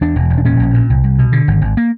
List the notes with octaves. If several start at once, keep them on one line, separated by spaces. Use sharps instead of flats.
E2 D4
E1
E1
D4
A#2 C#4
A#1
A#2
C2
C2
B2
D3
G#1
G#1
A#3